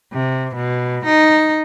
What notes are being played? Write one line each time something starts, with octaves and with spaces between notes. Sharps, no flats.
C3
B2
D#4